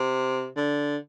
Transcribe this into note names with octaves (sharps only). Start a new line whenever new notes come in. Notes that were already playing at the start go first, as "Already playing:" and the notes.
Already playing: C3
D3